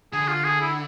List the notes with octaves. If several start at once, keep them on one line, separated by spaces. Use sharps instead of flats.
D3 G#4
F4
G#4
E4